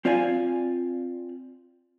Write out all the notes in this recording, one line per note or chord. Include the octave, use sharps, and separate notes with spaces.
C4 F4 D5 F5 G#5